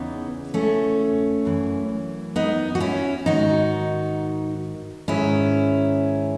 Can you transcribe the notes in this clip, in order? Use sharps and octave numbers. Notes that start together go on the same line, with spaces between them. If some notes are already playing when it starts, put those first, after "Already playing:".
Already playing: E2 C#3 E3 B3 D#4
A3 C#4
F#2 E3
B3 D#4
F#4
C#4 E4
G#2 D#3 D#4 F#4
G#2 D#3 C#4 E4